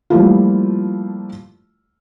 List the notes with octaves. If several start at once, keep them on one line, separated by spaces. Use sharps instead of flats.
F3 G3 A3 A#3 E4 F4